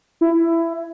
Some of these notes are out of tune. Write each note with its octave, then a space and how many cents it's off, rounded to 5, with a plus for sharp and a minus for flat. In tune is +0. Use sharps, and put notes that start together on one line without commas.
E4 +15